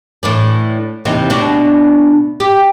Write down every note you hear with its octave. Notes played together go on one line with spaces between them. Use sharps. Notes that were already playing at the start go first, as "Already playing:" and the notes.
A2 E3 D4
D#2 C3 E3
D2 B2 D4
G4